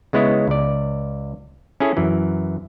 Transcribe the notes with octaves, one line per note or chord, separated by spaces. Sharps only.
C#3 G#3 B3 E4 C#5
C#2 D5
C#4 E4 G#4 A4
F#2 E3